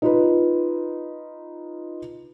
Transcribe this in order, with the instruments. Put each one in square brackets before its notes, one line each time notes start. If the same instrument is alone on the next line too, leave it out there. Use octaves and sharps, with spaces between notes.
[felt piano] D#4 F4 B4